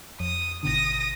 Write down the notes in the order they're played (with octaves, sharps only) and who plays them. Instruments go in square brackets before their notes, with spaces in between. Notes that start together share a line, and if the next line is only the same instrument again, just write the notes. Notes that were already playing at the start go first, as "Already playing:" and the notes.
[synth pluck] F2 [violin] D#6
[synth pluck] G#1 B2 D3 [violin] D#6 A#6